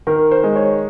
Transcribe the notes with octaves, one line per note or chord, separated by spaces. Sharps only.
D#3 A#4
C5
G#3
C#5